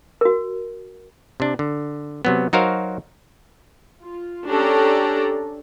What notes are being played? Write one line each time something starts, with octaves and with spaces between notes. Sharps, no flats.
F#4 A#4
C3 D4
D3
C3 F#3 B3
F#3 D#4 F#4 A#4 C5 F5
F4
C#4 D4 G4 A4 D5 A#5